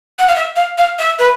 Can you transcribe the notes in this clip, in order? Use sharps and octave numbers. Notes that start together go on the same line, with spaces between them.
F#5
F5
E5
F5
F5
E5
B4